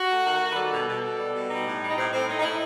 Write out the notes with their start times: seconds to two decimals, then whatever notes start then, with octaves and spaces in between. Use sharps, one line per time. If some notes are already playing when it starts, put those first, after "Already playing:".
Already playing: F#4
0.08 A3
0.24 D#3
0.40 D#3
0.49 B4
0.56 G3 A4
0.71 B2
0.87 B2
1.02 B2
1.18 G3
1.34 B2
1.50 G3 D#4
1.66 A2
1.81 G3
1.89 D#4
1.97 A2 C4
2.12 A2 C4
2.28 A2 D#4
2.40 D#4
2.44 A2 E4